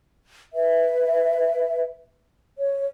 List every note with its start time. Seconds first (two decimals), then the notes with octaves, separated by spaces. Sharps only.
0.54 B4 E5
2.58 C#5